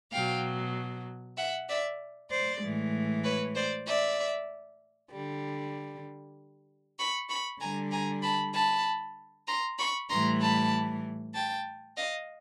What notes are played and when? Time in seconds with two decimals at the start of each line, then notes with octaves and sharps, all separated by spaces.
0.12 B2 F#3 F5 G5
1.37 E5 F#5
1.69 D5 E5
2.30 C5 D5
2.62 A2 E3 G#3
3.24 B4 C#5
3.55 C5 D5
3.87 D5 E5
5.11 D3 G3
6.98 B5 C#6
7.29 B5 C#6
7.60 D3 G3 G#5 A#5
7.91 G#5 A#5
8.22 A5 B5
8.54 A5 B5
9.47 A#5 C6
9.78 B5 C#6
10.09 A2 E3 G3 A#5 C6
10.40 A5 B5
11.34 G5 A5
11.96 D#5 F5